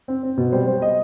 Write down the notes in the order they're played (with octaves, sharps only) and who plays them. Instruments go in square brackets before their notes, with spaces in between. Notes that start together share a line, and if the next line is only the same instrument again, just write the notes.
[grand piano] C4
C4
B2
G3 C5
G3 C5
D#5